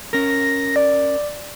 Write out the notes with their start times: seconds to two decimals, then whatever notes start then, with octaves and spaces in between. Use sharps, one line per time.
0.13 C#4 A#4 A#6
0.76 D5